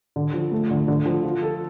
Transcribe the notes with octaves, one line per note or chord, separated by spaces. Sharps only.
D3
F3
A3
D3
D3
F3
F4
A4